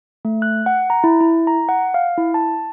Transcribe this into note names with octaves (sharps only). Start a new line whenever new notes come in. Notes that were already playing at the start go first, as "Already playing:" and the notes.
A3
F#6
F#5
A#5
E4
E4
A#5
F#5
F5
E4
A5